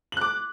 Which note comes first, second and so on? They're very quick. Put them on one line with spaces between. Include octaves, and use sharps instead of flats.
F#7 F#6 D6